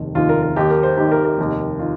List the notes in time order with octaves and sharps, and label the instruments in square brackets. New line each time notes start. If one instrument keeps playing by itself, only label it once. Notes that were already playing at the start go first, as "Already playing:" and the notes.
Already playing: [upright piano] F1 D#2 D#3
F1 D#2 D#3 F4
A#4
A#4
D#2 D#3 G4
A#4
C5
D#2 D#3 G4
A#4
A#4
F1 D#2 D#3
D#3 F4